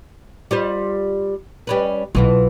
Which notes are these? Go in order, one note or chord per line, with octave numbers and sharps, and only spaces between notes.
G3 F4 C5
G3 C#4 B4
B1 B2 E3 F4